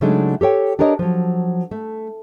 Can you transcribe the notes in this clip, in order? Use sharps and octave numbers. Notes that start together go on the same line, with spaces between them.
C#3 F#3 G#3 A3 D4 D#4
G4 A4 C#5 G5
D4 G4 A#4 C#5 D#5
F3 F#3
A3